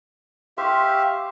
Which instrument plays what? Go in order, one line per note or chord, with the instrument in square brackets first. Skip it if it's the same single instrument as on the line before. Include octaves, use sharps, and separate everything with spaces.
[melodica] G4 E5 F5 [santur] C5 C#6